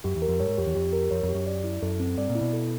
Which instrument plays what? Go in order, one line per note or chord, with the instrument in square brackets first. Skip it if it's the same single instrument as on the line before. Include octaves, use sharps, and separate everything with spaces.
[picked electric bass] F#2 [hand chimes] G4
[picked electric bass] E2
[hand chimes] A#4
[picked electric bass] F2
[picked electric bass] G2 [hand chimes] C#5
[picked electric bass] G#2
[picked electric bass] F2 [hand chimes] G4
[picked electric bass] E2
[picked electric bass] F2 [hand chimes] G4
[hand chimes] A#4
[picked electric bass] F2 [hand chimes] C#5
[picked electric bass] F2
[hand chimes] G4
[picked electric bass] F#2
[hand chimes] D5
E4
[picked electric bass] F#2 [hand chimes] A4
[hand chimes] C4
[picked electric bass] G2 [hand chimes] D5
[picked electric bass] A#2
[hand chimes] E4
[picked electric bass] B2
[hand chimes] A4